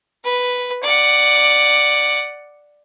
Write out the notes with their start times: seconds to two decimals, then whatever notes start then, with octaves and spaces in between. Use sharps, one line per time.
0.24 B4
0.83 D5 F#5